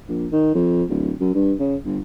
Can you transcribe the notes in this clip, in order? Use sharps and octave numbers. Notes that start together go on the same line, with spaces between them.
A#1
D#3
F2
D1
F#2
G2
C#3
G1